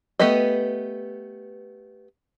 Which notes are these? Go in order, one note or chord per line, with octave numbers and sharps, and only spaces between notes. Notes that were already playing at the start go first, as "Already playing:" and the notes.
A3 B3 G4 B4 D#5